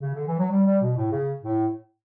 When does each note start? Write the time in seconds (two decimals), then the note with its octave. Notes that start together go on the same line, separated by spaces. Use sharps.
0.01 C#3
0.14 D3
0.26 E3
0.38 F#3
0.50 G3
0.66 G3
0.81 B2
0.96 A2
1.11 C#3
1.43 A2